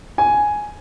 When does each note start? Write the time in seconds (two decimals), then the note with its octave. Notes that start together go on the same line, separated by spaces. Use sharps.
0.18 G#5